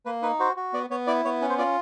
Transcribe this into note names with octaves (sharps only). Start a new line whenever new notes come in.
A#3 B4
D#4 B4
F#4 C5
F#4
B3 D5
B3 C#5
E4 D5
B3 C#5
C#4 B4
C5
F4 D5